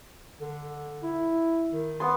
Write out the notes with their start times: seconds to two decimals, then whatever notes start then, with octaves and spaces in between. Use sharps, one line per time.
0.40 D3
1.03 E4
1.73 D#3
2.00 B3 C6